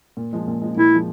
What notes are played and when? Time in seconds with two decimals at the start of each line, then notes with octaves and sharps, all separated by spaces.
0.17 A#2
0.33 F3 G#3
0.47 A#2
0.62 F3 G#3
0.77 A#2 E4
0.92 F3 G#3